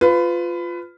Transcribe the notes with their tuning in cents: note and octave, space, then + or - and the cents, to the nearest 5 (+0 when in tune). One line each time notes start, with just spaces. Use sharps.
F4 +0 B4 +25